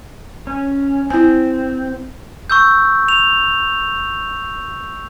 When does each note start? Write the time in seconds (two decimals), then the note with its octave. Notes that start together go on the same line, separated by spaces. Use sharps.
0.47 C#4
1.10 C4 E4 G#5
2.50 C#6 E6 G6
3.08 F7